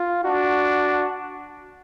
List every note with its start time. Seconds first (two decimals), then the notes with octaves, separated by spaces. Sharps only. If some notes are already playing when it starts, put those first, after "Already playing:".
Already playing: F4
0.24 D4 F#4